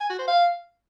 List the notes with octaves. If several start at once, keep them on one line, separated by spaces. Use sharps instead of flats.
G#5
F#4
C5
F5